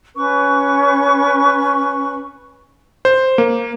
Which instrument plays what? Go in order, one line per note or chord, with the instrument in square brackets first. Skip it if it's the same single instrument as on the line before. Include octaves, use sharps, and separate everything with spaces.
[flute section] C#4 B4 C#6
[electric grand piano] C5
A#3